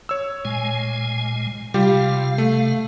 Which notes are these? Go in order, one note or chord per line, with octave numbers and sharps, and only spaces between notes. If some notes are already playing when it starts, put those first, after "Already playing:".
C#5 E6
A#2 G#3 G#5
C3 G3 F4 G4 F5
A3